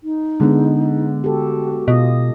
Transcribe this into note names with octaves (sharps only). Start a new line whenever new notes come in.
D#4
D3 G#3 B3
F#4 G4 A4
B2 F4 D#5